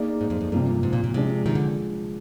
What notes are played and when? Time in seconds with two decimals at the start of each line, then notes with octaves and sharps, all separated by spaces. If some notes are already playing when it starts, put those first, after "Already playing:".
Already playing: A#3 D#4 G#4 D5
0.21 G#2
0.30 F2
0.41 F2
0.52 G2 C3 F3 A#3
0.83 G#2
0.93 A#2
1.04 A#2
1.14 C3 F3 G#3 D4
1.46 C3 D#3
1.55 D3